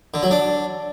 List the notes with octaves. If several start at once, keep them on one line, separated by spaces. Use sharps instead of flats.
D3
F#3
D4